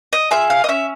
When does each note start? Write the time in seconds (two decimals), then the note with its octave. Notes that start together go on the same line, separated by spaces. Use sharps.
0.13 D#5
0.31 F4 G#4 E5
0.50 F5
0.64 D#5
0.68 C#4 E5